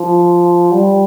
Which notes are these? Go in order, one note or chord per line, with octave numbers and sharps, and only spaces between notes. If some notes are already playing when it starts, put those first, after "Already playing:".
Already playing: F3
G3